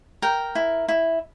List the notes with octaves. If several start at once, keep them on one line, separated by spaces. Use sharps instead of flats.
A#4 G5
E4
E4